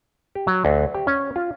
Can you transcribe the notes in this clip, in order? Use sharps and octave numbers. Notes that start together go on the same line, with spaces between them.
G4
F#3
D2
G4
C#4
F4